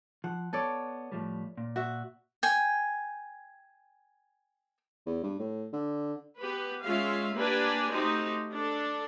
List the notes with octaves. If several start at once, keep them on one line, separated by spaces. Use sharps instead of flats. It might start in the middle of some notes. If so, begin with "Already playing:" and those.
F3 F#5
B3 A4 C#5 D5
A2 F3 G3
A#2
F#4 E5
G5 G#5
E2
G2
A2
D3
B3 G4 B4
G#3 C#4 F4 E5 F5
A#3 D4 G4 B4 D5 G#5
A3 C4 D#4 F#4 G4
D4 A4